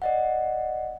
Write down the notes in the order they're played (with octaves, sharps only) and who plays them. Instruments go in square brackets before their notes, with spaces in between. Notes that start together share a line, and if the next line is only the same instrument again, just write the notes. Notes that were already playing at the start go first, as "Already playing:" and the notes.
[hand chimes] D5 D#5 F#5